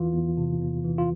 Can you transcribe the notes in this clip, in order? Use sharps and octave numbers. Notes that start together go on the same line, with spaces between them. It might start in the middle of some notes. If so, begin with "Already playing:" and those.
Already playing: E2 E3 F4
E2
C3
E2
E3
F4